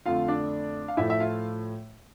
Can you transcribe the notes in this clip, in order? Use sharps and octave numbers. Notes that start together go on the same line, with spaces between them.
F2 D3 A3 F4 F5
D4 D5
F5
A2 F3 A3 E4 E5
E5
F4 F5